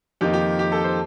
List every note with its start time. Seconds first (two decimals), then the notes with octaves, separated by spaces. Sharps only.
0.21 F2 D#3 A#3 D#4 G4
0.33 G4
0.59 G4
0.72 A4
0.84 C5